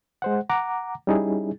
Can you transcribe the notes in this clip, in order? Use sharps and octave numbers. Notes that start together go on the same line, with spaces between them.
G#3 C5 F#5
F#5 A#5 D6
G3 C#4 D#4 E4 G#4